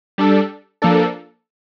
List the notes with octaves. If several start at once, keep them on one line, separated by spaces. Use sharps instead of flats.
G3 D4 A4
F3 A#3 D4 A4